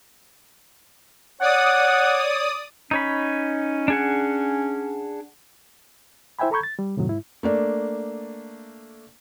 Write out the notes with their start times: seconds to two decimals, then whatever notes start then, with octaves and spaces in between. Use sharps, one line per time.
1.41 C#5 D5 F#5 D#6
2.91 C#4 D#4 C#5 B5
3.88 D4 G#4 F#5
6.39 E4 C5 E5 G5 G#5 B5
6.51 A4 A#5 B5 C#6 G6 G#6
6.63 A6
6.79 G3
6.97 F2 A2 C3 D#3 F#3
7.08 G#2 E4
7.43 A3 A#3 D4